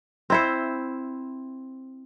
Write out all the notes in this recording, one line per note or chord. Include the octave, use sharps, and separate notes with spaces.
C4 E4 C5